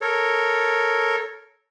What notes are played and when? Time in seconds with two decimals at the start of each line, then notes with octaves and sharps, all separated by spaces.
0.01 A4 A#4 C#5